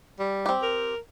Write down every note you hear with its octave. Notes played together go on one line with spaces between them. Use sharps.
G3
C4 G4
A#4